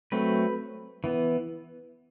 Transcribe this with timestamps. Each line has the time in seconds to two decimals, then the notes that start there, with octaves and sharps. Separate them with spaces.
0.12 F#3 A3 C4 B4
1.04 E3 B3